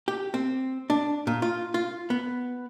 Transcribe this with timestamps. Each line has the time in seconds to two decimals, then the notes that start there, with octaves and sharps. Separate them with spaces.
0.08 G4
0.34 C4
0.90 D4
1.27 A#2
1.42 F4
1.74 F4
2.10 B3